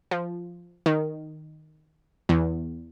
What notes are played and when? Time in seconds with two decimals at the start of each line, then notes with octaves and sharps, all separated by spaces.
0.11 F3
0.86 D#3
2.29 E2